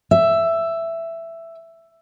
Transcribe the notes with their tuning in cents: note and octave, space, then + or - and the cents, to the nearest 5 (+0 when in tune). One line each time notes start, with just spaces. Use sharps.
E5 +10